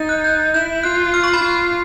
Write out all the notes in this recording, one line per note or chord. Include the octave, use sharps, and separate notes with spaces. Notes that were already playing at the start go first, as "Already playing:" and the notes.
Already playing: D#4 G6 A6
F#6
G6
E4 G6
F4 F#6
F6
C#6
B5
F4